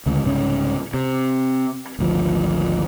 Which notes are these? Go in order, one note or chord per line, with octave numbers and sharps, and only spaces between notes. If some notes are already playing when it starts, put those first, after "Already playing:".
D2 C#3 G#3
C2 G#2 C#3 C#4
C3
G#1 D2 F3